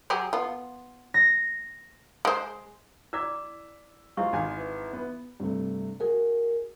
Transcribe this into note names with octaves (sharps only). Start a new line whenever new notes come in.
F#3 G4 G#4
B3 F4
A#6
G#3 C5
E4 D5 D6 E6 G#6 B6
G#3 E4 F4 C5 F5 C#6
G#1 G#5
E3
B3
G2 C3 A3
F#4 G#4 A#4